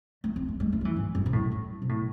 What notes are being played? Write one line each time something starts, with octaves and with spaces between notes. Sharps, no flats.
A3
C4
A3
G#3
A3
F#3
E3
G#2
F#2
C3
A2
F#2
C3
A2